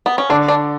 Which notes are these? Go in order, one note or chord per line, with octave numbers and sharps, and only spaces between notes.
B3
C#4
D3 D4
D4